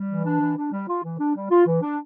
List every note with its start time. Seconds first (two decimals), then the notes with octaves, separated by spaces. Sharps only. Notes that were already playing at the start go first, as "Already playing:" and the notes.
Already playing: G3
0.09 E3
0.25 D4
0.41 E3
0.56 D4
0.72 G3
0.88 F4
1.03 E3
1.19 D4
1.35 G3
1.51 F4
1.66 E3
1.82 D4